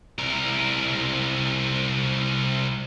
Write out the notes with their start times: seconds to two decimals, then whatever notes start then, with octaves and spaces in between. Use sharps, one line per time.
0.19 C2 A#4